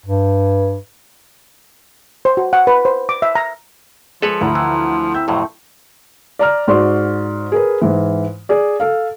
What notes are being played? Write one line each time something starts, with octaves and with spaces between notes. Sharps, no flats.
G2
C5
F#4
F#5
B4
C5
D6
E5
A#5
F3 G#3 A4 B4 C#5
D2 E4 A#5 B5
E3
C4 E5 G6
F2 A2 C3 F#3 A3
D5 A#5 F6
G#2 F#4 D5 C6
G#4 A#4 B4
G#2 E3
G#4 D5
A4 F5